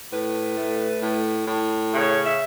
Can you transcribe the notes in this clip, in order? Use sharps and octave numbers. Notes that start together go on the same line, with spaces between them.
A2 B4
A3
A2
A2
C#3 C#5
E5